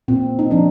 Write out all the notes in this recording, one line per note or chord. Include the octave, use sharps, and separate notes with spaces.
A#2 C4
D#4
F3 C4 D4